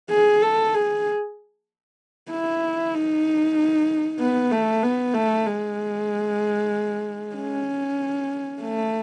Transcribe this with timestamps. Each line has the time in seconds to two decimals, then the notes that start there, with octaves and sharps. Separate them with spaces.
0.10 G#4
0.42 A4
0.74 G#4
2.31 E4
2.94 D#4
4.20 B3
4.51 A3
4.83 B3
5.14 A3
5.46 G#3
7.35 C#4
8.62 A3